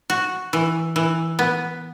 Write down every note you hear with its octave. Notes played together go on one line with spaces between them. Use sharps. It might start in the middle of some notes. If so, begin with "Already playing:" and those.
F#4
E3
E3
B3